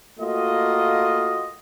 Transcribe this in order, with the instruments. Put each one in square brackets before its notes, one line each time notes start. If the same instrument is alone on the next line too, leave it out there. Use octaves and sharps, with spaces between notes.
[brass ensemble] A3 A#3 F4 F#4 D#5